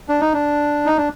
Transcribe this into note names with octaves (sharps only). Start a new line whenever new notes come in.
D4
D#4
D4
D#4
D4